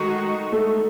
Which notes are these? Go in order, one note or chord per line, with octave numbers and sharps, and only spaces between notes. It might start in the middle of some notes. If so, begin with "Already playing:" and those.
Already playing: D#3 G#3 A3 D#4 F#4
A3